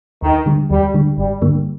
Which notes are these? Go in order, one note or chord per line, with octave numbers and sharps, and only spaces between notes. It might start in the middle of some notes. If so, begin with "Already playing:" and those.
D#2 D#3
D3 G3
D#2 G3
D3 G3
G1 G3
G2 D3 G3 A#3